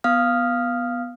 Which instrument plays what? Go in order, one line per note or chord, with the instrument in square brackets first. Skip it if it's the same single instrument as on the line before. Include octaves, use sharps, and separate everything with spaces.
[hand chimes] B3 F5 D#6 F6